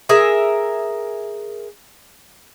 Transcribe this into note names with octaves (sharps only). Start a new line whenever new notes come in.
G#4 A#4 E5